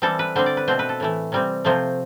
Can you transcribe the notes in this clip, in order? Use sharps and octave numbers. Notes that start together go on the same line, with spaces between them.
E3 G3 C4 A4
B4
D3 G3 C4 C5
D5
B4
B2 A3 C4 C5
B4
A4
A2 E3 A3
C3 G3 C4
C3 F3 A3 C5